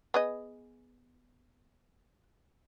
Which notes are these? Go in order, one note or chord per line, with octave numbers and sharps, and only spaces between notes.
B3 G#4 D#5